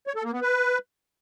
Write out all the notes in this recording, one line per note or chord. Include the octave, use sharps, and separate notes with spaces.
C#5
A4
A#3
B3
B4